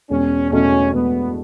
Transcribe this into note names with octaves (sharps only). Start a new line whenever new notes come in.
E1 C#4
E2 B2 A3 C#4
E1 B3